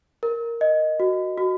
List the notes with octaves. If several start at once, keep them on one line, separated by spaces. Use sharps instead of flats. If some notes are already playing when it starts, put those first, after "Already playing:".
A#4
D#5
F#4
F#4